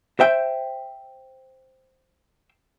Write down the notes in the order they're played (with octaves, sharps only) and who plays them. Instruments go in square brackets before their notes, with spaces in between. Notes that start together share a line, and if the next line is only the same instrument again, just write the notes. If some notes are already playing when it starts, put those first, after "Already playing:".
[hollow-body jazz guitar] C5 E5 G5